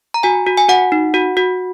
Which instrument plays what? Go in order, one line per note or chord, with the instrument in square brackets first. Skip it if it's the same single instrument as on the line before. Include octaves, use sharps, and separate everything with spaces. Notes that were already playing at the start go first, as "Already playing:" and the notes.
[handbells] A#5
F#4 G#5
F#4
G#5
F#4 F#5
D#4
F#4
F#4